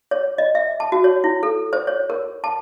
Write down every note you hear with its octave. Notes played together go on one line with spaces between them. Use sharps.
C#5
D#5
E5
A5
F#4
C#5
E4
A4
C5
C#5
A#4
A5